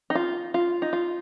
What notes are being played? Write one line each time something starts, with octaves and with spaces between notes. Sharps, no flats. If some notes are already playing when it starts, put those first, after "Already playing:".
D#4
F4
F4
D#4
F4